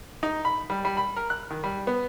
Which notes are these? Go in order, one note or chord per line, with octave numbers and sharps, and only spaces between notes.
D#4
B5
G3
G3
B5
A#4
F#6
D#3
G3
B3